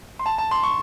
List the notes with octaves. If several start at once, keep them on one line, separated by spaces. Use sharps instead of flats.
C6
A5
A5
C6
C#6